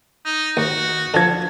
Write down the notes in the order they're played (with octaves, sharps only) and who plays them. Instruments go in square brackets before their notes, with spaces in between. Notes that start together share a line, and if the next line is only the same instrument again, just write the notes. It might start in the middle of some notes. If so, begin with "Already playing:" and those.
[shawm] D#4
[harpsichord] D#2 [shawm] F#4
[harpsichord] D3 F3 [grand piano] A5 G#6